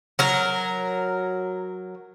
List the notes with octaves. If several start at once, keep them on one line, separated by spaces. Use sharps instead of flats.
F#3 A#4